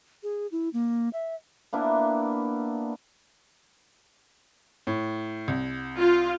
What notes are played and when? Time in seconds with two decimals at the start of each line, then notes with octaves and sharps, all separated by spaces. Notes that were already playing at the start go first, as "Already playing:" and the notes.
0.23 G#4
0.52 E4
0.73 A#3
1.13 E5
1.73 A#3 B3 D4 E4
4.87 A2
5.48 C2
5.99 F4